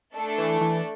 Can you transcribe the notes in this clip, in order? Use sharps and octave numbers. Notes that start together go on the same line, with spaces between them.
A3 D4 A4
E3
E3